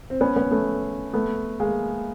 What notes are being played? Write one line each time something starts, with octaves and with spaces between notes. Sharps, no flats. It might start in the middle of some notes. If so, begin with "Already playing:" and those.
C4
B3 C#4
B3 C#4
A3 B3
A3 B3
G#3 A#3